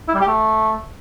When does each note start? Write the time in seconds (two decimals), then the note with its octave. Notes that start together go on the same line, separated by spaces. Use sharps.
0.08 E4
0.15 G3
0.21 G4
0.28 A3